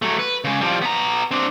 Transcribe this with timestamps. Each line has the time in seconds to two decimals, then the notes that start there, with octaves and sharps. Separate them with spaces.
0.02 F#3 A3
0.19 B4
0.44 C#3 G#3
0.61 F3 G3
0.82 B3 A#5
1.31 C4 D4